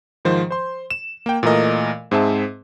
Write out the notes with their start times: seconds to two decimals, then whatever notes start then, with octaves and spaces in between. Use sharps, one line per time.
0.25 G#2 D#3 F3 C5
0.50 C5 C6
0.90 E7
1.26 A#3 G5
1.43 A#2 E3 A3 A#4 D#5
2.11 G#2 C4 G#4 E5 A5